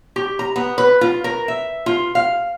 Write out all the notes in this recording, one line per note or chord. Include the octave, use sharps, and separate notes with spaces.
G4
A#5
B3
B4
F4
A#4
E5
F4
F5